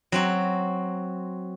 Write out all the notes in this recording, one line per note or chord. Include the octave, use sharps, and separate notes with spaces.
F#3 C4 F#4